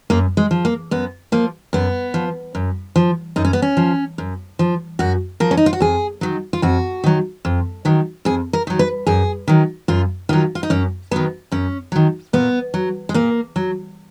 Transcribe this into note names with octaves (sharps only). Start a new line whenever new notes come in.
F#2 A#3
G#3
F3
A#3
F#2 B3
F3 A#3
F#2 B3
F3
F#2
F3
F#2 D#4
C#4
B3
C#4
F3
F#2
F3
F#2 F#4
F3 A#4
C#4
D#4
F4
F#4
F2 G#4
D#3 F#3
F4
F2 F#4
D#3 F#3
F2
D#3 F#3
F2 G#4
A#4
D#3 F#3
B4
F#2 G#4
D#3 F#3
F#2 F4
D#3 F#3 F4
F4
D#4
F#2 C#4
D#3 F#3 B3
F#2 C#4
D#3 F#3
A#2 B3
F#3
G#3
A#2 A#3
F#3